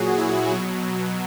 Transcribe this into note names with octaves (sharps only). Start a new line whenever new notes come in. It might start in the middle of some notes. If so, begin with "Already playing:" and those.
Already playing: A#2 F#3 F#4 G#4
E4
B2 F#3